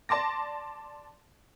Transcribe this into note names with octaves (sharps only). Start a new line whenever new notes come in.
D5 A5 C6 D6 A#6